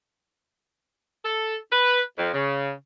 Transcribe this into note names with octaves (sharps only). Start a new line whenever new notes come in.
A4
B4
F2
C#3